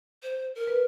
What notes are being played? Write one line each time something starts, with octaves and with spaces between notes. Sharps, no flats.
C5
A#4
B4